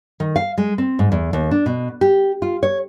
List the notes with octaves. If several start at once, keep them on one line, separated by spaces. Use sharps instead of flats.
D#3
F5
G#3
C4
G#2
E2
D#2
D4
B2
G4
F4
C#5